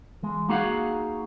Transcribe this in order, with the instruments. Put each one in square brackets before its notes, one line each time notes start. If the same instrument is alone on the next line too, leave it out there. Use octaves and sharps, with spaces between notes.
[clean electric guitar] E3 G#3
A#3 D#4 F#4 G#4 F5 F#5